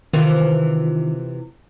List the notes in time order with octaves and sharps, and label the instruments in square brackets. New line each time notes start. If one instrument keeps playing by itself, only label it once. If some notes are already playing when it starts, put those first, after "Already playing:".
[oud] C3 E3 F4 [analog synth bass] D#3